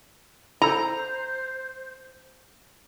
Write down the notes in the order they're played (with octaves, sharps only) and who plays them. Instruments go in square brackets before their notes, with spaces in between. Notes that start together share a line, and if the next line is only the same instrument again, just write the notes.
[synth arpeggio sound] E4 A4 [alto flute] C5 [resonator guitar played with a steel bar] A#5